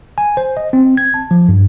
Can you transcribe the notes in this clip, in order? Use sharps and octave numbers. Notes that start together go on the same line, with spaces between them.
G#5
C5
D#5
C4
G#6
A5
F3
G2